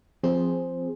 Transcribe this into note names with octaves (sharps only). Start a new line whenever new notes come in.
F3 C4 G#4 C5